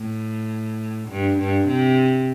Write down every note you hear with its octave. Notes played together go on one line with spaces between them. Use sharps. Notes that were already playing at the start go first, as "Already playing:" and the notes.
Already playing: A2
G2
G2
C3